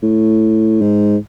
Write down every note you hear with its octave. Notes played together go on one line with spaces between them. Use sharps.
A2
G#2